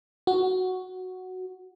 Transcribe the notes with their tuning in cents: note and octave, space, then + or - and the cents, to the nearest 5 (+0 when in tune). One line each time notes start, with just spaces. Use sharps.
F#4 +0